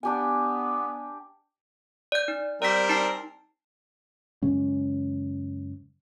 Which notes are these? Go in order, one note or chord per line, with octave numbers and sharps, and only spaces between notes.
B3 D4 G4 G#5
D5 G6
D#4
G3 C4 A#4 D5 B6
D#4 A5 C7
F#2 C#3 G#3 C#4